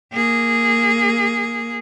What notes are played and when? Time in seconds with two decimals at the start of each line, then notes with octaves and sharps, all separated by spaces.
0.13 A#3 G#4